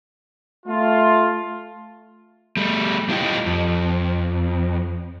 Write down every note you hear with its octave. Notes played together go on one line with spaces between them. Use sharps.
A3 F4
G3 A3
G3 E4 F4 G4 D#5 G5
F2